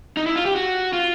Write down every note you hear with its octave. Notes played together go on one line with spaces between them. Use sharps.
D#4
E4
F4
G4
F#4
F4